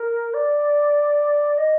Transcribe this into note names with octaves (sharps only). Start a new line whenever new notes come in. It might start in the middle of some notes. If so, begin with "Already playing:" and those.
Already playing: A#4
D5
D#5